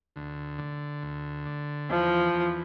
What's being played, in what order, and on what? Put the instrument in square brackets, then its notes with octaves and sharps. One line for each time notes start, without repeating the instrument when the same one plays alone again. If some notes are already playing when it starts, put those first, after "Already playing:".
[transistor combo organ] D2
D3
D2
D3
[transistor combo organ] E2 [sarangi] F3
[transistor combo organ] E2